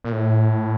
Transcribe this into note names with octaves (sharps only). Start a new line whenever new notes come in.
A#2
A2